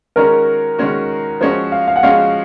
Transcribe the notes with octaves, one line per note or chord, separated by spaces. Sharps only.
D#3 G#3 C#4 F#4 A#4
D#3 G#3 C#4 F#4
F3 G#3 C#4 F#4 C5
F5
F5
F#5
F3 G#3 C#4 F#4 F5